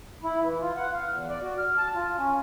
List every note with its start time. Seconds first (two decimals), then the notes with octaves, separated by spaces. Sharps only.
0.24 E4
0.43 E3
0.61 F4
0.76 F#5
0.94 F5
1.10 E2
1.29 D5
1.42 F#4
1.58 F6
1.78 A5
1.95 F4
2.18 C#4